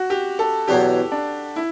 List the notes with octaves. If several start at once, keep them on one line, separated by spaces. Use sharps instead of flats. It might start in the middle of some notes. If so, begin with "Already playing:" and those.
Already playing: F#4
G4
A4
E2 B2 F#3 G4
D4
E4